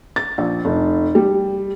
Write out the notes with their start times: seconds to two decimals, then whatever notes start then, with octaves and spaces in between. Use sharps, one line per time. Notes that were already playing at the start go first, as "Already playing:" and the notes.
0.16 A6
0.38 A#1
0.65 F1
1.15 G3